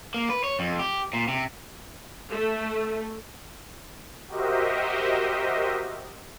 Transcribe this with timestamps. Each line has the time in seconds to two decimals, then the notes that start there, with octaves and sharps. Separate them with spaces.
0.14 A#3
0.30 B4
0.44 C#5
0.59 F2
0.79 G4
1.13 A#2
1.28 C3
2.30 A3
4.28 F#4 G4 A#4 C5 D#5 E5